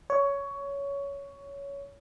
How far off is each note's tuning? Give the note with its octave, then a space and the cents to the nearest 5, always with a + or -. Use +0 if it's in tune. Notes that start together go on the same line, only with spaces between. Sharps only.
C#5 +15